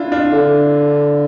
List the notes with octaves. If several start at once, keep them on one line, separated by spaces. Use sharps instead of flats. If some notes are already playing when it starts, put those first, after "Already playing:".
Already playing: D4 E4 F4
D4 F4
D3